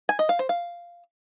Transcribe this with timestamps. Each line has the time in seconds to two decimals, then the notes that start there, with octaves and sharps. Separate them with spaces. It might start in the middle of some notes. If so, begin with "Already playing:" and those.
0.09 G#5
0.19 D#5
0.29 F5
0.39 C5
0.49 F5